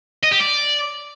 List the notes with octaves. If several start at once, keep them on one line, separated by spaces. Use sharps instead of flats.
D#5
G4
D5